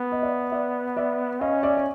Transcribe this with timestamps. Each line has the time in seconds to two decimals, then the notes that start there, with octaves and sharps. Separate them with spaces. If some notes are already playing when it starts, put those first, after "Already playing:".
Already playing: B3
0.12 D#5
0.22 D5 E5
0.52 D5 E5
0.97 D5 E5
1.41 C#4 D#5 F5
1.63 D5 E5
1.77 D5